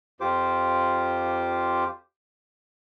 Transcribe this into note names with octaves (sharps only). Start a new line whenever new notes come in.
F2 F4 G4 C5 D6